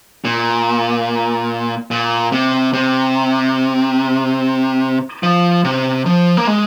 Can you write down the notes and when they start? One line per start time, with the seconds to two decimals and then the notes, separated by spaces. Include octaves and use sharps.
0.25 A#2
1.91 A#2
2.32 C3
2.73 C3
5.23 F3
5.64 C3
6.06 F3
6.37 A#3
6.47 G#3